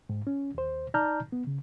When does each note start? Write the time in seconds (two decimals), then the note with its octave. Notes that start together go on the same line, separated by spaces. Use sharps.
0.09 G#2
0.27 C#4
0.55 D#2 C5
0.94 D#4 D5 A5 A#5 F6 G6
1.32 B3
1.47 C#3